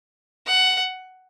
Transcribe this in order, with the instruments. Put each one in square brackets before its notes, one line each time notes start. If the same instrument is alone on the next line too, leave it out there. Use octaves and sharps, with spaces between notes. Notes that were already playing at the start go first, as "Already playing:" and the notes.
[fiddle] F#5